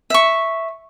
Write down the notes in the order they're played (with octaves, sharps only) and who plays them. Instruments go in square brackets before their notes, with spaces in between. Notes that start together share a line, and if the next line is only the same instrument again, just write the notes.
[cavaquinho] E5 C#6